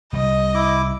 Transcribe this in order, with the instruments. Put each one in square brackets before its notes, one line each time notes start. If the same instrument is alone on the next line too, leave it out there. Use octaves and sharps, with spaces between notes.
[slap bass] C2 G3 [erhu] D#5
[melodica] E4 D6